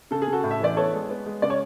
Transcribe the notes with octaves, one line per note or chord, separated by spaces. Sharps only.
C#3 A4
G#4
C#3
F#4 A4
A2
E5
E3 D5
B3 A4 C#5
G#3
B3
G#3
C#3 D5
C#5